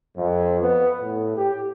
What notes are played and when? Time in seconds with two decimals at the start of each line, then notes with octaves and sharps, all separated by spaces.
0.15 F2
0.59 B3
1.01 A2
1.35 G4